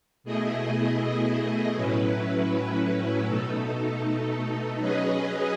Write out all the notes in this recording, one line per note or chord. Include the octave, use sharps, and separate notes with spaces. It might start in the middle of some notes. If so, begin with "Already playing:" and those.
B2 A3 E4 G#4 D#5
A2 F#3 C#4 E4 B4
B2 A3 D#4 A4
F#3 C#4 G#4 B4 D#5